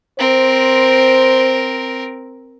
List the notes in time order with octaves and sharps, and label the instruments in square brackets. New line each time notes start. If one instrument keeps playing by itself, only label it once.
[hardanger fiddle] C4 A#4 [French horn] C5